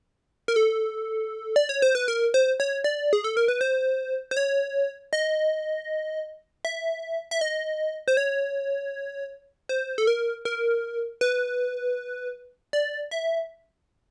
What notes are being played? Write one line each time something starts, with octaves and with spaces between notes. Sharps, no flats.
A#4
A4
D5
C#5
C5
B4
A#4
C5
C#5
D5
G#4
A4
A#4
B4
C5
C5
C#5
D#5
E5
E5
D#5
C5
C#5
C5
A4
A#4
A#4
B4
D5
E5